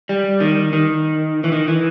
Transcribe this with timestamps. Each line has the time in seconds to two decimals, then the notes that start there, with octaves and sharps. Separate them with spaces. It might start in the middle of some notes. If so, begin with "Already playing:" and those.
0.09 G3
0.40 D#3
0.73 D#3
1.44 E3
1.52 D#3
1.68 E3